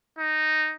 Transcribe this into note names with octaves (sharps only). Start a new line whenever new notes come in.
D#4